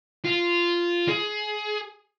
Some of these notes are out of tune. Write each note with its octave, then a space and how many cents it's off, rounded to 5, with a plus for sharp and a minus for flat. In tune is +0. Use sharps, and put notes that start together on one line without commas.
F4 -10
G#4 +20